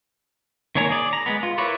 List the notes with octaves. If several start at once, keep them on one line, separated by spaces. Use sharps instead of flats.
D#3 A#3 C#5 G#5 A#5
G#4 D5
A#5
G#3 B3
F4
E4 A#4 B4 C#5 D5